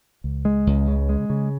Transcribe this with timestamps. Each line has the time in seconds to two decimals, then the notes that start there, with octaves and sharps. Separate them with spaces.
0.24 C#2
0.45 G#3
0.67 C#2
0.88 C#3
1.09 G#3
1.30 C#3